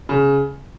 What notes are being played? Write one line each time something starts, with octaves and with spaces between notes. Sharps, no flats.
C#3